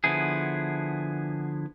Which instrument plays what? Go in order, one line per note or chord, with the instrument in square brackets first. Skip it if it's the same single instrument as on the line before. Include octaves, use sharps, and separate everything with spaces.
[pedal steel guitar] D3 F3 B3 E4 G#4